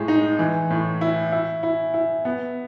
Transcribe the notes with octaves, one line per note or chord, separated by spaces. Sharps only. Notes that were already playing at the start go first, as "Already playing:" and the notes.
Already playing: A2 G#3
D#4
E3
A2
E4
E4
E4
E4
B3